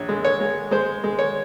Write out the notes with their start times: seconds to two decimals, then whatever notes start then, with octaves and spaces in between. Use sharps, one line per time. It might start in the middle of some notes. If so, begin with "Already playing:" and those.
Already playing: A#1 C#5
0.09 G#3
0.25 C#5
0.40 G#3
0.71 G#3 C5
1.04 G#3
1.19 C#5